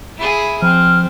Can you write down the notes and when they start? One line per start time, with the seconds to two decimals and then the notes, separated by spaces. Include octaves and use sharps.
0.18 E4 G#4
0.62 F3 C4 F6